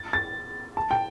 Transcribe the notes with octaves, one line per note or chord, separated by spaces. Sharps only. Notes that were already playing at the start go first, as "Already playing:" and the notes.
Already playing: A6
A6
A5
G5